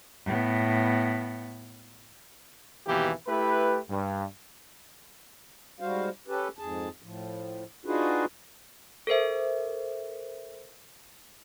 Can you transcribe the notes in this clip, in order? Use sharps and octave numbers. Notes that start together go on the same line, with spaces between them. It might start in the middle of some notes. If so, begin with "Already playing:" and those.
A2 B3
G#1 D#2 B2 E3 A#3 G4
A3 E4 G4 B4
G2
G#2 G3 F#4 C5 F5
C#4 G4 A4 B4
F2 G#2 G#4 A5
A2 F3
D4 D#4 F4 F#4 G#4 B4
A4 A#4 C5 E5